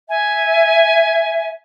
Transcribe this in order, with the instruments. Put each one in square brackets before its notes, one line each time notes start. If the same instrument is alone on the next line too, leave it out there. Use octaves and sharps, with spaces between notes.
[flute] E5 [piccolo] G#5